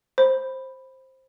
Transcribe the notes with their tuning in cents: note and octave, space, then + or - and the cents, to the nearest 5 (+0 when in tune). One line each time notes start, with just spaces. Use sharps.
C5 +10 B5 +0